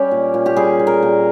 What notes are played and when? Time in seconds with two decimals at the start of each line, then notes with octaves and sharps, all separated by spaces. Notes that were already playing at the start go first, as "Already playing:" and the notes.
Already playing: G3 C#4 G4
0.11 A#2
0.34 A#2
0.46 G4
0.56 G3 G#4
0.80 G3
0.87 A#4
1.02 A#2